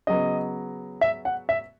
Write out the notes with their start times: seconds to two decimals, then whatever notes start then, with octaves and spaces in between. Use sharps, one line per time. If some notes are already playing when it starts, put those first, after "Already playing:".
0.07 C#3 F#3 B3 D#5
1.01 E5
1.25 F#5
1.49 E5